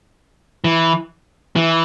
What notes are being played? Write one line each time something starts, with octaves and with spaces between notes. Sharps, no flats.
E3
E3